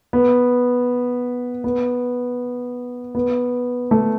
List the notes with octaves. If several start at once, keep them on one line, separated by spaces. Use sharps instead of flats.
B3
B3
B3
A3